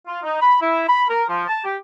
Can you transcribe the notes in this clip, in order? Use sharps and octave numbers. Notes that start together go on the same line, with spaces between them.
F4
D#4
B5
E4
B5
A#4
F3
A5
G4